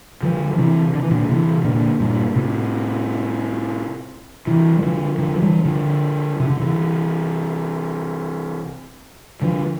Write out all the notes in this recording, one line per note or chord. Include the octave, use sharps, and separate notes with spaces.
D3 F3
F3
C3 E3
D3
E3
A#2 D3
C3 E3
A#2 D3
G2 A#2
A2 C3
C3 E3
G3
D3 F3
D3 F3
F3
E3 G3
D3 F3
C3
D3
C3 E3
D3 F3